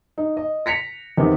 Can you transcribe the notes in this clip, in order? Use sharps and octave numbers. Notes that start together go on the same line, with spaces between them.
D#4
D#5
A#6 B6 C#7 F7
E2 C3 D#3